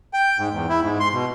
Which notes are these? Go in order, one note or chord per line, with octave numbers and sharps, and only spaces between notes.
G5
G#2
E2
E4
G#2
C6
B2